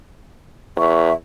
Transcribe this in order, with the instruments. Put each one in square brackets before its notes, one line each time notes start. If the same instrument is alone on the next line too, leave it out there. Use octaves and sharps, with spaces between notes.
[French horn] E2 [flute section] E5 C#6